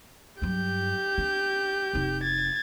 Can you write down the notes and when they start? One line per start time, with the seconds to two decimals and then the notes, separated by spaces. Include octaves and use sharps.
0.42 G2 F#3 G4 G6
1.18 D4
1.93 F1 D#4
2.23 G#6 A6